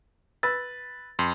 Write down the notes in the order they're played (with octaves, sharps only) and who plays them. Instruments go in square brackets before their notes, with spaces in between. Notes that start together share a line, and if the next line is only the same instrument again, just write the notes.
[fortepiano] B4 E6 [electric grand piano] A6
[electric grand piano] F2 C6